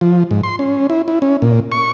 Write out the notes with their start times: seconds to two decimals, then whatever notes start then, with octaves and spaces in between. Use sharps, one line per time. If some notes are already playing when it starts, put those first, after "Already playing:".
0.01 F3
0.31 G#2
0.43 C6
0.59 C#4
0.90 E4
1.08 E4
1.22 C#4
1.42 A#2
1.72 C#6